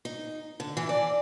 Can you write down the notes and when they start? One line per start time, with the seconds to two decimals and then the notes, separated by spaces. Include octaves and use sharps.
0.05 D#4
0.60 D3
0.77 E3
0.89 D5